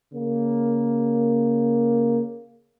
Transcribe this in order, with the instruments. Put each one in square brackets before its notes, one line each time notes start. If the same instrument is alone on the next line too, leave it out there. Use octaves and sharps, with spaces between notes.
[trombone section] C#3 A#3